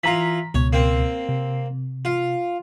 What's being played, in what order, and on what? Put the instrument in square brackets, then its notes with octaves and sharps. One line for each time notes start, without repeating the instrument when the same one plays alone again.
[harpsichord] E3 F4 [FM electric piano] A#5 B6
[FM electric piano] C#2 B2 [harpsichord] C#5
[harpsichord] A#3 C4
[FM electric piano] C3
[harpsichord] F4